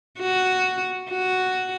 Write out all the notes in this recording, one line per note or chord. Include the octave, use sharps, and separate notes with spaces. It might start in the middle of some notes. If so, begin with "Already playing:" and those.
F#4
F#4